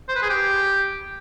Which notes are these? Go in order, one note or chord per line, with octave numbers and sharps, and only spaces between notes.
C5
B4
G#4
G4